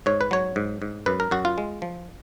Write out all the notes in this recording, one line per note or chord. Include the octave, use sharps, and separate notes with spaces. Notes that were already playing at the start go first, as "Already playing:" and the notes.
G#2 C#5
B4
F#3 C#5
G#2
G#2
F#2 B4
A#4
F#2 F#4
F4
G#3
F3